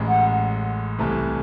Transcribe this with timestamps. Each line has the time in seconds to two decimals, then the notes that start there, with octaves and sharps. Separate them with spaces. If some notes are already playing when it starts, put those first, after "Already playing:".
Already playing: A1 A2 G#3
0.08 F#5
0.99 C2 C3 E3 A3